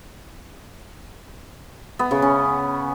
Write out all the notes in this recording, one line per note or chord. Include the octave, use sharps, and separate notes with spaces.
B3
C#3
C#4